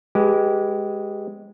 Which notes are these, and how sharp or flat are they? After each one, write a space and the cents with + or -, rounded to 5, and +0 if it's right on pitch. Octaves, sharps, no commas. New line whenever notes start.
G#3 +0 G4 -20 B4 +0